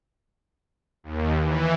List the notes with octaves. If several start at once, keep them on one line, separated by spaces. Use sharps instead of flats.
D#2
E3